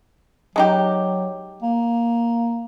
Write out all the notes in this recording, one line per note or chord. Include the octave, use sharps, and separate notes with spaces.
F#3 G#3 D#4 G4
A#3